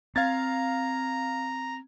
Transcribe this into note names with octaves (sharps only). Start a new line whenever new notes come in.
C4 F5 A#5 G#6 A6